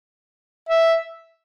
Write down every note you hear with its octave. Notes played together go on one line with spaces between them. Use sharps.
E5